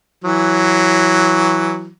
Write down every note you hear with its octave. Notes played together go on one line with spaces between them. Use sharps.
E3 F#3